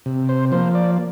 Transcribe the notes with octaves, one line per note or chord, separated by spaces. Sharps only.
C3
C5
F3 A#3 C5
D5